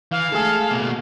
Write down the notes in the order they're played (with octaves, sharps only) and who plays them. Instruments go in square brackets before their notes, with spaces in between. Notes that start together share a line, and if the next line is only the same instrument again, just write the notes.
[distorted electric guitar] E3 [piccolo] F5
[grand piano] G#3 A3 G#4 [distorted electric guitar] A4
[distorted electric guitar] B2 A#3